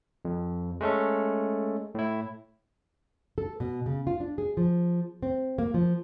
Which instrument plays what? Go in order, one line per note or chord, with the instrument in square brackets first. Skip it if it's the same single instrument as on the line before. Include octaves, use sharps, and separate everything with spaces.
[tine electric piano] F2
G#3 A3 C#4 A4
A2 E4
[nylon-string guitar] A4
B2
C#3
F4
D4
G#4
F3
C4
A#3
F3